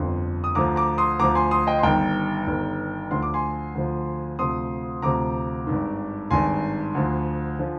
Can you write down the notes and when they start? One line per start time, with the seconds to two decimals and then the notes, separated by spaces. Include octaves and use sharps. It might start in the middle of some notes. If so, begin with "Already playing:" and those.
Already playing: G1 F2 D3 C6
0.44 D#6
0.55 D2 D3 F3 A#5 D6
0.76 A#5 D6
0.98 C6 D#6
1.19 D2 D3 F3 A#5 D6
1.35 G#5 C6
1.51 C6 D#6
1.67 D#5 G5
1.79 C6
1.83 G1 G2 D#3 G5 A#5
2.47 G1 G2 D#3
3.11 D2 D3 F3 C6
3.23 D6
3.34 G#5 C6
3.75 D2 D3 F3
4.39 D2 C3 F3 C6 D#6
5.02 D2 C3 F3 A#5 D6
5.67 G#1 G2 D#3
6.30 G#1 G2 D#3 G#5 C6
6.95 D2 D3 F3
7.59 D3 F3